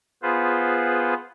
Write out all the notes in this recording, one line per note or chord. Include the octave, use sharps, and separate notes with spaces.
B3 F4 G#4 B4 C5